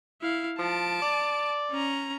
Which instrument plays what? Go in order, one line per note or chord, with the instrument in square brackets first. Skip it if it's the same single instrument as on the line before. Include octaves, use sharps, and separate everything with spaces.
[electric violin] E4 F5
[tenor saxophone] F3 [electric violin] A5 D7
[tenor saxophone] D5
[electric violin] C#4 A#5